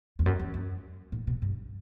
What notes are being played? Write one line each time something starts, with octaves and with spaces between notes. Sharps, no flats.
E2
F#2
E2
F#2
A2
B2
G2